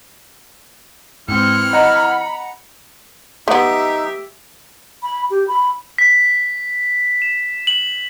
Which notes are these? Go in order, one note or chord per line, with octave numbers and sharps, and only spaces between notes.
G#2 E3 C4 F6 C#7
D#5 F#5 A#5 B5 C#7
A3 B3 D#4 G4 E5
B5
G4
B5
B6
E7
F#7